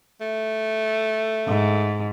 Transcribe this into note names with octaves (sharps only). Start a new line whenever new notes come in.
A3
G#2